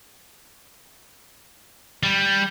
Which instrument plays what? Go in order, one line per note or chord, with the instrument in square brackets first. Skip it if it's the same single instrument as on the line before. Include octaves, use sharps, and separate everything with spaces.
[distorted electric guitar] G3